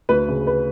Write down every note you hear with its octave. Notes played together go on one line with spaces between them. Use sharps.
D2 B4
C#3
B4